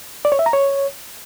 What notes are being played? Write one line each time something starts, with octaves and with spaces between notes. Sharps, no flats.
D5
C#5
E5
A#5
C#5